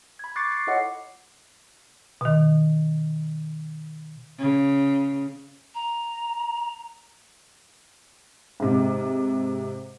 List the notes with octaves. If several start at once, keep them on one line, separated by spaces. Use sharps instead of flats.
B5 G#6
C#6 D6 F#6 A6 C7 C#7
C7 C#7
E4 F4 A4 C#5 D#5 F#5
B2 D#3
C#3
A#5
G#2 C3